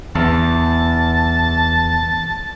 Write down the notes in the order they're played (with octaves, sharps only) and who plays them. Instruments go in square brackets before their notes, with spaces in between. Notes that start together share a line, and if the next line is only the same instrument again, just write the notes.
[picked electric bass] E2 [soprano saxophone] A5